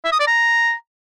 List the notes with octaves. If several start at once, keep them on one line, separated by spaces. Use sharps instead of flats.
E5
D#6
D5
A#5